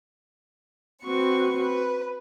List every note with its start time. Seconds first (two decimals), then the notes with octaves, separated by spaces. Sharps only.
1.03 C4 F#4 B4 C#6
1.60 B4